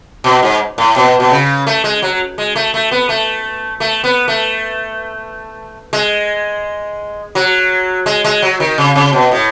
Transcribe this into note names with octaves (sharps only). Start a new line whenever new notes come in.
B2
G#2
A2
B2
B2
C#3
A3
G#3
F#3
G#3
A3
A3
B3
A3
A3
B3
A3
G#3
F#3
G#3
G#3
F#3
D#3
C#3
C#3
B2
A2